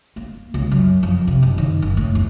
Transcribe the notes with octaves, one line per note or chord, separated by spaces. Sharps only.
A#3
C#2
F#2
F2
C3
F#1
D#3
F#1
A2
E2